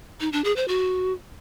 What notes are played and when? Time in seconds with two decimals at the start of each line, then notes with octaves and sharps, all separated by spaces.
0.20 D#4
0.32 D4
0.44 G#4
0.56 C5
0.68 F#4